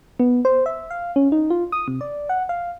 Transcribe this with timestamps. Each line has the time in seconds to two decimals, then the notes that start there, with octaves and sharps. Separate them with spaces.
0.20 B3
0.45 C5
0.66 E5
0.91 F5
1.16 C#4
1.32 D#4
1.50 F4
1.72 D#6
1.88 C3
2.01 D5
2.29 F#5
2.49 F5